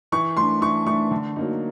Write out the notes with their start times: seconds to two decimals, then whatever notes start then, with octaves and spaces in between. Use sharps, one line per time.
0.12 E3 C#6
0.37 A3 D4 C6
0.61 E3 C#6
0.86 A3 C#6
0.91 D4
1.11 D3
1.36 F#3 A#3 D#4